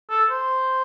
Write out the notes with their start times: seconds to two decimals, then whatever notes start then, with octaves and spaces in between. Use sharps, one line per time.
0.10 A4
0.30 C5